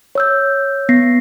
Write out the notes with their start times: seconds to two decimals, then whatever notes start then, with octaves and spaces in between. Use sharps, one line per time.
0.15 C#5 E6 G6
0.89 B3 A#6 C7